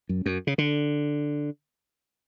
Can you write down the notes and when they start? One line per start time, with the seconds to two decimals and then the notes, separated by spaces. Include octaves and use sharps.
0.09 F#2
0.26 F#2
0.47 C#3
0.58 D3